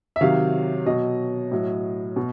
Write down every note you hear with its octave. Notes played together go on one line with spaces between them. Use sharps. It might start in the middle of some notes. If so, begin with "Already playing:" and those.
E5
C3 D#3 F#3 F5
B2 F#3 D#5
A2 F#3
B2